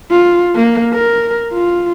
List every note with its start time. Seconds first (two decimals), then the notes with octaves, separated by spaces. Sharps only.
0.11 F4
0.55 A#3
0.93 A#4
1.52 F4